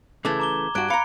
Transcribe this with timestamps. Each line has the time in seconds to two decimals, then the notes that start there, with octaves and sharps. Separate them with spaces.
0.25 C#3 E3 A3 D6 G#6
0.40 A#5 D6 G7
0.75 G2 F#4 F#6 G#6 D7
0.90 F5 A#5 B5 C#7